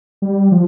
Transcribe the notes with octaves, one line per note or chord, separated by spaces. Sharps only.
G3
F3